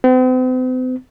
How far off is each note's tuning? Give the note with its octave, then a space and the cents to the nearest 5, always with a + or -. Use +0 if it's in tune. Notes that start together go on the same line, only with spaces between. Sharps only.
C4 -45